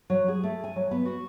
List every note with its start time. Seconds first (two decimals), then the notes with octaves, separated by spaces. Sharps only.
0.10 F#3
0.28 G#4
0.44 A3
0.64 G#5
0.76 F#3
0.91 B3
1.05 F#4